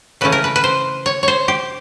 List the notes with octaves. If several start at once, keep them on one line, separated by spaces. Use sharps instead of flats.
C#3 E3 A3 C#4 B4
A#4
B4
B4
C5
C#5
C5 C#5
G4